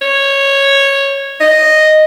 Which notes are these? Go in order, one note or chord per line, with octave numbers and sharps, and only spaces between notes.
C#5
D#5